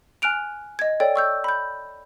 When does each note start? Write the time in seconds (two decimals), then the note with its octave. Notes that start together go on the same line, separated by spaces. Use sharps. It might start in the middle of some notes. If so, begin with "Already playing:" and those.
0.22 G#5 F6 F#6 D7 F7
0.79 D#5 G#6
1.00 A4 C#5 D5 G5
1.16 C#6 E6 G6
1.44 B5 G6